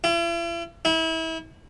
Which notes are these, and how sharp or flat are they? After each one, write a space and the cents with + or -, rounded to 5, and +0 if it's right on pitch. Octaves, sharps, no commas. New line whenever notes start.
E4 +45
E4 -30